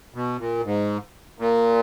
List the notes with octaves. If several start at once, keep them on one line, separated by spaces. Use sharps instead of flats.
B2
A#2
G#2
A#2